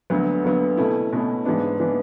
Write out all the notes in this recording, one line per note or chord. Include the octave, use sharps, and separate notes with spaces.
D2 D3 F#3 B3
D2 D3 F#3 B3
B2 A3 C#4 E4
B2 A3 C#4 E4
G#2 E3 B3 D4
E3 B3 D4